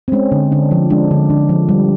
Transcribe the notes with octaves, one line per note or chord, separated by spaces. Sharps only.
C4
G#3 C#4
D3
D3 D4
F3
G#3 D4
D3
D3
F3
G3